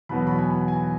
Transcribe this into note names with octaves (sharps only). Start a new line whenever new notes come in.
E2 B2 F#3 B3 B5
B5
G#5
G#5